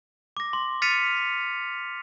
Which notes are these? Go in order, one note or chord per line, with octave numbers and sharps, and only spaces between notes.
D6 A#6
C6
F6 A6 B6 C#7 D#7 F7